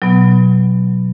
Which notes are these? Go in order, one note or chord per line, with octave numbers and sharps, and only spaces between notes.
B2 F#3 B3